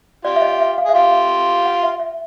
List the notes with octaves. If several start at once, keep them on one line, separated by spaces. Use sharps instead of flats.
F4 G4 D5
E5
D#5
E5
F5
G#4 E5
F4 G4 F5
F#5
E5
E5